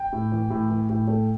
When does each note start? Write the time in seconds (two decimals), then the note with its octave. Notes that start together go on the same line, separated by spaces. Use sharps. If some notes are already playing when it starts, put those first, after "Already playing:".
Already playing: G5
0.13 A2
0.32 E3
0.50 A2
0.70 E3
0.89 A2
1.07 A3